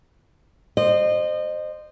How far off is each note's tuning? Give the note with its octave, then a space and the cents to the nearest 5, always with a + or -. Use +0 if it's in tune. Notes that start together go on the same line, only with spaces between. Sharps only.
C5 +0 D#5 -30